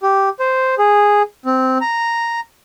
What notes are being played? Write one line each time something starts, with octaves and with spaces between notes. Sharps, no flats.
G4
C5
G#4
C4
A#5